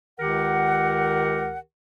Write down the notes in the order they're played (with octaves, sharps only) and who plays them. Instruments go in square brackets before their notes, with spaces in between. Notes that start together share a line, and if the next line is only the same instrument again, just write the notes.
[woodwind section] C#2 D#3 G4 A#4 F#5